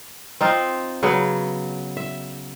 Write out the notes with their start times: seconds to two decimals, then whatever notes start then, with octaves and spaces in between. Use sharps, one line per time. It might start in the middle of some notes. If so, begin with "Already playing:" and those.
0.41 C4 D#4 F4
1.03 C#3 F#3 B3
1.97 E5